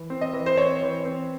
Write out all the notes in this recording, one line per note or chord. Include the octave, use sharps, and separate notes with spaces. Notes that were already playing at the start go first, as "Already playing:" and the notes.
Already playing: E3
C4
D#5
E3
C5
C4 C#5
E3
C4